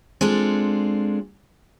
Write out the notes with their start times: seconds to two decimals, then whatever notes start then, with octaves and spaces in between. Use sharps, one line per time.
0.21 G#3 C4 D4 F4 G#4 A4